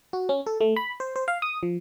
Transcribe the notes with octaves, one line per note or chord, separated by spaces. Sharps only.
F#4
C#4
A4
A3
B5
C5
C5
F5
D#6
F3